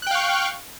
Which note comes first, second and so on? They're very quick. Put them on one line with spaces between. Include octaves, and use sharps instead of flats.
F#6 G5 F5 C#6